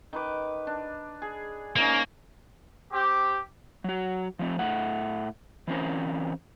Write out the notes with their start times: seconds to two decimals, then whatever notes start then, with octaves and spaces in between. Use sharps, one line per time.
0.13 D#3 B4 D6
0.67 D4
1.22 G#4
1.76 A#3 C#4 D#4 C5
2.91 C4 G4
3.84 F#3 F#4
4.39 F3 A3 C4
4.59 A2 A3 F#5
5.67 E3 F#3 C4 C#4 A#4 C5